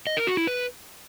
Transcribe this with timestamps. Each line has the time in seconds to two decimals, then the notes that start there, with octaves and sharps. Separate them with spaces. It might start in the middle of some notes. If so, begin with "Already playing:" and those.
0.07 D#5
0.17 A#4
0.27 F#4
0.37 E4
0.47 B4